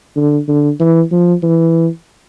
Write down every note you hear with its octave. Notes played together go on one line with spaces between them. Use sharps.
D3
D3
E3
F3
E3